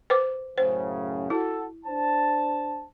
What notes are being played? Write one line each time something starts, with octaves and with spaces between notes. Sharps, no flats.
B4 C5 D6
F#2 A2 C#3 C5
E4 F#4 A4
D4 C5 A5